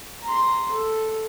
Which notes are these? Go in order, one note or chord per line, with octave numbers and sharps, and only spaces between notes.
A#5 C6
A4